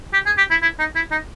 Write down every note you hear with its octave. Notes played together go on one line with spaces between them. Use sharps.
G4
G#4
G4
E4
E4
D#4
E4
D#4